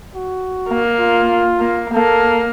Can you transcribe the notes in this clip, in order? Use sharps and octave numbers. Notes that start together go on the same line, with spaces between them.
F#4
A#3
F4
A#3
A#3 A4